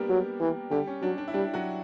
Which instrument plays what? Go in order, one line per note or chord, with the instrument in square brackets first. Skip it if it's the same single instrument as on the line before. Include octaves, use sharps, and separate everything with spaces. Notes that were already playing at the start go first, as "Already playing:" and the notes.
Already playing: [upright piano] G3 A#3 B3 D4 G4 A#4
[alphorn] F#3
E3
[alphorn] D3 [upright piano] G3 G4
[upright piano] C#4
[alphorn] F#3 [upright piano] D4
[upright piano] D4
E4
[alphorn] G3 [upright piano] D4
[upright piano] F#3 F#4